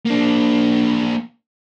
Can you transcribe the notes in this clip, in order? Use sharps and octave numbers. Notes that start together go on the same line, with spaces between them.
A#3 D4